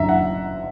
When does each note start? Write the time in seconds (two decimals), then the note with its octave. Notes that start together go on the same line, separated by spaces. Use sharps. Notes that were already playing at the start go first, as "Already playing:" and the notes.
Already playing: F#1 F#2 D3 E5 A#5
0.09 F#5